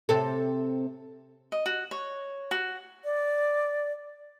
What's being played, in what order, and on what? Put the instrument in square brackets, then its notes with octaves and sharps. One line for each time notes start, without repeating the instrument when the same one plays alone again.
[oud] C3 C4 A4
[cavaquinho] D#5
F#4
C#5
F#4
[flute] D5